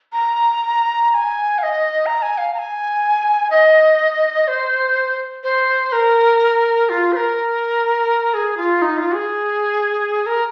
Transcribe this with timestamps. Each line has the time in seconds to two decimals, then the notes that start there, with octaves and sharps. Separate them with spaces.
0.13 A#5
1.10 A#5
1.14 G#5
1.58 F5
1.63 D#5
2.06 A#5
2.22 G#5
2.38 F5
2.54 A#5
2.59 G#5
3.51 D#5
4.48 C5
5.43 C5
5.92 A#4
6.89 F4
7.13 C5
7.16 A#4
8.34 G#4
8.57 F4
8.82 D#4
8.98 F4
9.14 G#4
10.26 A#4